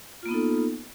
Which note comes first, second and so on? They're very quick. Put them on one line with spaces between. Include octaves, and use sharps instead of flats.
F4 A#3 B3 D#4 A4